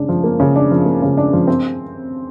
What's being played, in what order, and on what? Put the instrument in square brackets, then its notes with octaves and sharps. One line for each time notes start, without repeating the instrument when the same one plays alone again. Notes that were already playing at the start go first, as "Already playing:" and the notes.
Already playing: [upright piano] C#3 D4
F3
A#3
C#3
D4
F3
A#3
C#3
D4
F3
C4